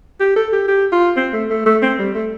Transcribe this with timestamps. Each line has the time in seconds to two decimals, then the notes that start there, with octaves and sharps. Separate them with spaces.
0.20 G4
0.36 A4
0.53 G4
0.68 G4
0.92 F4
1.17 C4
1.33 A3
1.50 A3
1.66 A3
1.82 C4
1.99 G3
2.15 A3